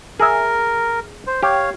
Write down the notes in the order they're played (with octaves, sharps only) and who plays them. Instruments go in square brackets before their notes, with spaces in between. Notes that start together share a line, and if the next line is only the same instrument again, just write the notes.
[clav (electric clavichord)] G#4 E5 [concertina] A#4
[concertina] C5
[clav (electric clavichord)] G4 [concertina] C#5 F5